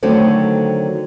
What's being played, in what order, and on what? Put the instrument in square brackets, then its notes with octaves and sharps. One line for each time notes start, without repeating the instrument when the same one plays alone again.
[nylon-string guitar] D3 D#3 F#3 A3 C4